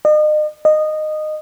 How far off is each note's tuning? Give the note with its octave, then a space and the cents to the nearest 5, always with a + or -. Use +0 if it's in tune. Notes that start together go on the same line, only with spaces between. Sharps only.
D#5 -40
D#5 -15